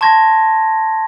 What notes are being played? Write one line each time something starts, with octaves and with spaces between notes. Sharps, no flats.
A5 C6 C#6 G#6 A#6